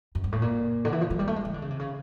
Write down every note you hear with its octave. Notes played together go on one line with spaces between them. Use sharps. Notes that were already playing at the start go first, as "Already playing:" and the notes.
F#2
G2
A2
A#2
D3
E3
F3
F#3
G3
A3
G#3
E3
D3
C#3
C3
C#3